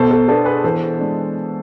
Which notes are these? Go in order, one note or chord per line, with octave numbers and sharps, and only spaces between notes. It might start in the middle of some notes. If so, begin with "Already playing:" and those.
Already playing: B2 A4 C5
A4
B3 D4 A4
G#4 B4
E3 A4 C5
G#3 D4